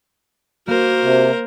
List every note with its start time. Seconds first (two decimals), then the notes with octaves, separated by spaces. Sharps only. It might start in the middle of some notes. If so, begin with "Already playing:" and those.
0.68 A#3 F#4 A#4 C5
1.02 C3